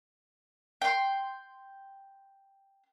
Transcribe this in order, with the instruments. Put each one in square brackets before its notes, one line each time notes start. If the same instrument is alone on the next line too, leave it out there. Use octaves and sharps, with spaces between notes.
[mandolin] G5 C6